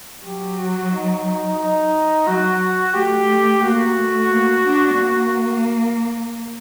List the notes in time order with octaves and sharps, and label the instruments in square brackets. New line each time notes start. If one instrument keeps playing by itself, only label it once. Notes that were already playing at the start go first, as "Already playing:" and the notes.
[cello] F#3 [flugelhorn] G4
[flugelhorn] F#4
D#4
D#4
[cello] F#3 [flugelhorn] F#4
[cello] A3 [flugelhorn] G4
[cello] A3
[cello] A#3 [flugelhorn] F#4
[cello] A3
A#3
D4
A#3